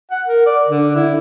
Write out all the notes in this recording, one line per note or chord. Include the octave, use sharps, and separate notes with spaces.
F#5
A#4
D5
D3
E4